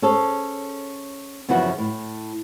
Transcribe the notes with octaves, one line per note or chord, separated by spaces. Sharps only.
C#4 G#4 A4 C5 C#5
F#2 C#3 E3 F3 C#4 F#4
A2